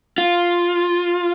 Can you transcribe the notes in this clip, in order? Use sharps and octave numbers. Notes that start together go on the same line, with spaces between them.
F4